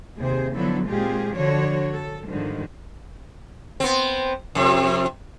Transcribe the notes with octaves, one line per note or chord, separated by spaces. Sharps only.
D#2 C3 G#4 C5
D3 F3 F#3 B3 E4 A4
A#2 G#3 C4 F4 G4 G#4
D3 F3 D4 F#4 C#5
A4
G#2 D3 D#3 F3 G3
B3 C4
F2 C3